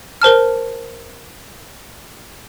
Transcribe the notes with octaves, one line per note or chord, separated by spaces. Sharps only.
A#4 C5 A5 F6